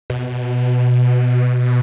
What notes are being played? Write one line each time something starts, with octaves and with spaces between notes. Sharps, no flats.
B2